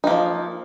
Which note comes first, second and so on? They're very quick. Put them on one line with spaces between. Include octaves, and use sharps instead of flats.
D#4 A#3 F3